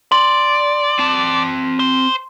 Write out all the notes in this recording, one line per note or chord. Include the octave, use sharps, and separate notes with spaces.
D5 C6
C4 A5
C5